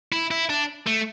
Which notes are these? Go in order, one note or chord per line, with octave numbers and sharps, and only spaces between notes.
E4
E4
D4
A3